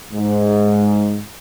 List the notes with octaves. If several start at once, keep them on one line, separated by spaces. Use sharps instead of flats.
G#2